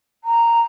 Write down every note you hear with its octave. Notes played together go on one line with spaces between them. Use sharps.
A#5